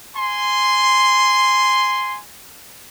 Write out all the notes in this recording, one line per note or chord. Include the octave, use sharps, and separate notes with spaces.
G#5 C6